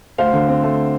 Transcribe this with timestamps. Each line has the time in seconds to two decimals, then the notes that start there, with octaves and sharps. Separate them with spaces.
0.18 D2 C5 F5
0.33 D3
0.48 C4
0.63 A3